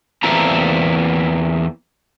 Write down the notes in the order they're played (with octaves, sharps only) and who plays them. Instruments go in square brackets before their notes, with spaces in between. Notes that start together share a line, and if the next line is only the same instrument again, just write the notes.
[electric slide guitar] E2 A#3 C4 E4 A4 A#5